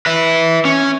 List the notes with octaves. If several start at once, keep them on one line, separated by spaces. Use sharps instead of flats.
B4 E5
C#4